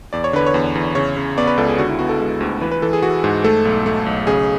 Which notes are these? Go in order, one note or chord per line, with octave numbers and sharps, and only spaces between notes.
E2 D5
C#5
D3 B4
C#5
E2
E2
C#3 C#5
C#3
B3 D5
B4
C#2 A4
G#4
D3 F#4
E4
B3 F#4
A4
G#3
D2
E3 B4
B4
E3 A4
G#4
E3 F#4
G#2
A3 A4
B1
A3
B1
C#3 G#4